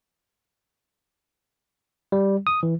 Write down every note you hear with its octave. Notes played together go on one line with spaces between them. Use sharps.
G3
D#6
E3